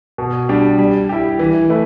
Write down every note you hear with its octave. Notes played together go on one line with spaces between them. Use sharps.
B2
G3 D4 G4
G3
E4 G4
E3
A3 E4 B4